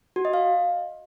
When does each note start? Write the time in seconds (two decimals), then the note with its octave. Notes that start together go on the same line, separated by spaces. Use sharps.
0.16 F#4
0.25 D#5
0.33 F5